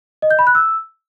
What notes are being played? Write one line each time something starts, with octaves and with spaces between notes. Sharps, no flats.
D#5
G6
B5
F#6
E6